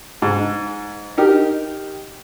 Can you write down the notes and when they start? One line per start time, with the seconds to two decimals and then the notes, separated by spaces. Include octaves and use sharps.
0.22 G#2
1.18 D#4 G4 A#4